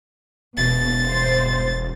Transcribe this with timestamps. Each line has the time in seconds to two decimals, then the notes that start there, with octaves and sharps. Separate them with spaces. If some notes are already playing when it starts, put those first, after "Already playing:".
0.57 E1 B2 A6
1.04 G2 B2 C5